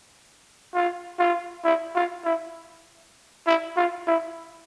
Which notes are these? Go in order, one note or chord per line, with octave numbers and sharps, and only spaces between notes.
F4
F4
E4
F4
E4
E4
F4
E4